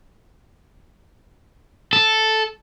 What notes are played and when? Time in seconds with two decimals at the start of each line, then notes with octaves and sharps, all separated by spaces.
1.93 A4